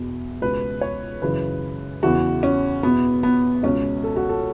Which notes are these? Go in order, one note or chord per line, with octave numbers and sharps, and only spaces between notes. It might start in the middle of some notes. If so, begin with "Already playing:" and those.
Already playing: E2 B2
C#2 B2 B4
C#5
F#2 C#3 E3 B4
E2 C#3 E3 F#4
C#4
E2 B2 B3
B3
C#2 B2 C#4
A4
F#4
A4